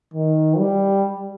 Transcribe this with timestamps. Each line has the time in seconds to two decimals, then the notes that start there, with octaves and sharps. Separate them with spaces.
0.14 D#3
0.58 G3